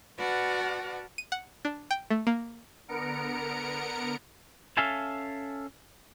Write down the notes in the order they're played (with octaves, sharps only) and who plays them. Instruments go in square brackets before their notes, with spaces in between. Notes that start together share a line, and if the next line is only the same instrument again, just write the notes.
[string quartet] F#4 B4 D5 F#5 A5 F6
[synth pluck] D#7
F#5
D4
G5
A3
A#3
[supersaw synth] D3 B3 A#4 A#5 C#7 D7
[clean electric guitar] C#4 A4 E5 F5 G#5 A5